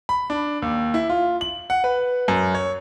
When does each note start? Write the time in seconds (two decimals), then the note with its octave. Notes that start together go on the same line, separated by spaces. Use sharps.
0.09 B5
0.30 D4
0.62 D#2
0.94 E4
1.09 F4
1.41 F#7
1.70 F#5
1.84 B4
2.28 F#2
2.55 C#5